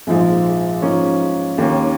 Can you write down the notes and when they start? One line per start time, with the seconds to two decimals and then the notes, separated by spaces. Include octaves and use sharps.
0.07 A#1 G#2 F3 G#3
0.82 G#2 F3 A#3 C#4
1.58 D#2 D#3 A#3 C#4